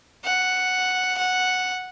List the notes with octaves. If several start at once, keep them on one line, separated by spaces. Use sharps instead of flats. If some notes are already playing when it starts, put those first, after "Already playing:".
F#5
F#5